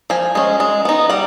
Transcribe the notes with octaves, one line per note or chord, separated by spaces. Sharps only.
F3 G#5
G#3 C#4
G#3
B3 D#4
G3 F#5